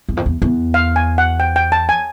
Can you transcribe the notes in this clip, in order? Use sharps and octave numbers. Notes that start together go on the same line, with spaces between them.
E2
F2
E2
E2
F5
G#5
F#5
G5
G5
A5
G#5